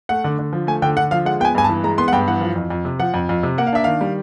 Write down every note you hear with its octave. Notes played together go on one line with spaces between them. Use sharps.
A3 F#5
D3
D3
F3
A3 G#5
D3 G5
D3 F#5
F3 F5
G#3 F#5
B3 G5 G#5
G2 G#5
A5
E3
G#3 A#5
B3 C6
F#5
G2 G5
E3 F#5
F3
F2
F2
C3
F3 F#5
F2
F2
C3
A#3 F#5
F5
D4 E5
D#3 F5
G3